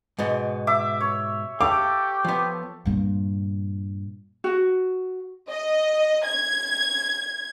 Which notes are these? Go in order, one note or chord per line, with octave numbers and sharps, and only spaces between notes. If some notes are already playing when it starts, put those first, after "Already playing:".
G#2 B2 B3
E5 D6
C#5
G4 A4 F5 D6
F3 B3
G2 A#2
F#4
D#5
G#6